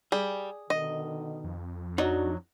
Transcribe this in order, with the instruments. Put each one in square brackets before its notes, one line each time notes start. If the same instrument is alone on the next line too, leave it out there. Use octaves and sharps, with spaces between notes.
[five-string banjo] G3 [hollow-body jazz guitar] G#4
[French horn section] B2 D3 D#3 [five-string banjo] D#5
[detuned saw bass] F2
[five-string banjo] F#3 [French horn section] D4 F#4 [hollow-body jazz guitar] D#4 D5 D#5